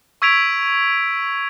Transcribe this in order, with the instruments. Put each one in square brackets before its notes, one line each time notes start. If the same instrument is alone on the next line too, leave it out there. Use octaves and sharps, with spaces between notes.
[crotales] C#6 E6 G#6 B6 D7 F7